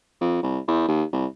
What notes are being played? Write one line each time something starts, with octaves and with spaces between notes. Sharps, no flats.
F2
C2
E2
D#2
C2